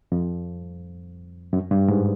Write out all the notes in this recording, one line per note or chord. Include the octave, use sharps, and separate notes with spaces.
F2
F#2
G2
G#2